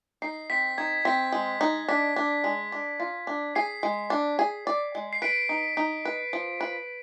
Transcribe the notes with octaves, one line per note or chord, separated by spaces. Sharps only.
D#4 C7
C4 B6
D#4 G#6
C4 B6
G#3
D#4
D4 B6
D4
G#3
D4
F4
D4
G#4 C7
G#3
D4
G#4
D5
G#3
C7
B4 B6 D7
D#4
D#4
B4
F3
B4